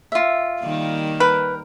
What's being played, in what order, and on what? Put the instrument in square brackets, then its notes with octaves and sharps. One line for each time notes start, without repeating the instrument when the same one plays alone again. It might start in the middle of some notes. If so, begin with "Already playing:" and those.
[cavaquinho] F4 E5
[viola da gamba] D#3 G3 A#3
[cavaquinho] A#4 G5 [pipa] B4